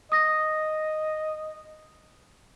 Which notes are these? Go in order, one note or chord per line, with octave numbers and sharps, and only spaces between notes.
D#5 D#6 A#6